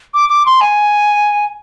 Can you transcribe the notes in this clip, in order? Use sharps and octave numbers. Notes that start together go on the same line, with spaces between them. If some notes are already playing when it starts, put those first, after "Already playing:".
D6
D6
C6
G#5